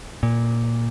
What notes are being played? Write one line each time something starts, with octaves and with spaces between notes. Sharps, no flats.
A#2